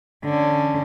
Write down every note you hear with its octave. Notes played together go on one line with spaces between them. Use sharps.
D3 C#4